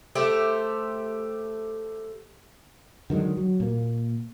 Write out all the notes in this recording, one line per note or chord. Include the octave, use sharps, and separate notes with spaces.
A3 G4 C5
D3 D#3 F#3 G#3
F#3
A#2 A#3